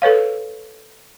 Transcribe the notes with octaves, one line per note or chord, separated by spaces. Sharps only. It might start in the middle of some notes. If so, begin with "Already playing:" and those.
A4 B4 C#5 F5